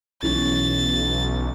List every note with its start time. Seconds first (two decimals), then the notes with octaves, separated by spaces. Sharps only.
0.23 B1 E3 C#4 A6